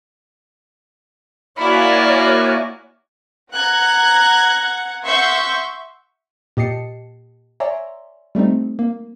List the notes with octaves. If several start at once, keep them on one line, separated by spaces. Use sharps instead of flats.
A#3 E4 F#4 C#5 D5 F5 G#5 B5
F#5 A#5 F#6 G#6
E5 F#5 C6 C#6 E6 G6
A#2 G4 D#5 A5 C7 C#7
C#5 D5 E5 G#5 A#5 C6
G3 A3 C4 D#4
A#3